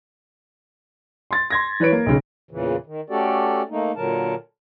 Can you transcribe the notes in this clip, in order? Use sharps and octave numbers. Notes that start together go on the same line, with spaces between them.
C6 A6
C6 G#6 A#6
E3 B4 C#5 D7
A#3
B1 C#3
E2 A#2 C#3 E3
D#3
A3 C#4 F#4 G4 A4 D5
A3 A#3 D#4
A#2 D3 F#3 A#4 A5